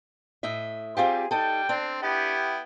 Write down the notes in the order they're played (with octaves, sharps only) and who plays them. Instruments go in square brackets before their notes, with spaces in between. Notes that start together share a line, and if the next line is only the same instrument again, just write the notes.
[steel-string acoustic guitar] A2 D#5 E5
[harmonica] G3 [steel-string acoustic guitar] C4 F4 G4 [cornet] G#4
[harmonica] G3 [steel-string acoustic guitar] D#4 A4 [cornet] G5
[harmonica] C4 [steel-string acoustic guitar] D4
[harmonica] B3 E4 G5 [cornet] G4